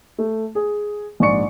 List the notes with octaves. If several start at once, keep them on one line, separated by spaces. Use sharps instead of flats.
A3
G#4
A#1 G#2 D5 C#6 C#7